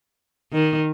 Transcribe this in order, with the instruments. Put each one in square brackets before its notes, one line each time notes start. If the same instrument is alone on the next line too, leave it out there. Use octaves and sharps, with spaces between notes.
[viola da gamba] D#3